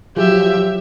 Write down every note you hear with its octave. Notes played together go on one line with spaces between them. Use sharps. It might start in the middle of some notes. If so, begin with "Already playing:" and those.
F3 F#3 G4 G#4 E5